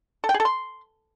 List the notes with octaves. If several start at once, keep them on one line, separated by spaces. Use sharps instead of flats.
A4
G5
G#4
A4
C6